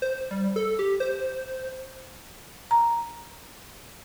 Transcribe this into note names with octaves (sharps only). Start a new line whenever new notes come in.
C5
G3
A4
G4
C5
A#5